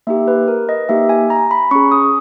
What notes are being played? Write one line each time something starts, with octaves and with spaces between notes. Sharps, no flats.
A#3 D#4 G4 E5
B4
A#4
D#5
A#3 D#4 G4 E5
G#5
A#5
B5
C#4 G#4 C#6
D#6